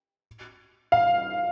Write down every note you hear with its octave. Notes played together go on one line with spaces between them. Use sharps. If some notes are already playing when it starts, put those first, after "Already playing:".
F5